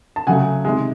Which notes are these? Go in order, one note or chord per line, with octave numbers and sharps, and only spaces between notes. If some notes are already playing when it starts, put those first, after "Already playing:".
A5
C#3 F#3 A3 F#5 G#5
C3 D#3 G#3